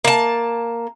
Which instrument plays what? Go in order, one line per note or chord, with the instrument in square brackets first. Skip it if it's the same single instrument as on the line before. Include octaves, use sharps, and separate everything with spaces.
[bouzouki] A#3 A5